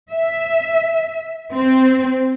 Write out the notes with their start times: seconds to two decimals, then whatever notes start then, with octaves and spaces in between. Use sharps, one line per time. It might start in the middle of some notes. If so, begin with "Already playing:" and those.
0.11 E5
1.55 C4